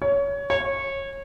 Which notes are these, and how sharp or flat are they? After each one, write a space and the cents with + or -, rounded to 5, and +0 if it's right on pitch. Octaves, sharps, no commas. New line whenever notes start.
C#5 +20
C#5 -20